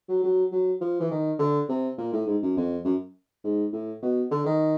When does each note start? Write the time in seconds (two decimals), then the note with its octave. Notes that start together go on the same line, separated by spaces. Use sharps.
0.09 F#3
0.23 F#3
0.52 F#3
0.81 F3
1.00 E3
1.11 D#3
1.39 D3
1.69 C3
1.98 A#2
2.13 A2
2.27 G#2
2.42 F#2
2.57 F2
2.85 F#2
3.44 G#2
3.73 A2
4.03 B2
4.31 D3
4.46 D#3